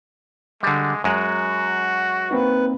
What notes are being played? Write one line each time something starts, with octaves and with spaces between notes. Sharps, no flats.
D3 G3 G#3
F#2 G#3 F#4
A#3 C4 D#4 B4